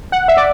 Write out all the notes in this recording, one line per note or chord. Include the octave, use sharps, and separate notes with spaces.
F#5
E5
D5